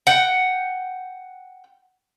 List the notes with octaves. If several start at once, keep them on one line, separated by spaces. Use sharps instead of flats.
F#5 G5